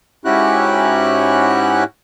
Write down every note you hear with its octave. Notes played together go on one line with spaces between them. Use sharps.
G#2 C#4 E4 F#4 G4 F#6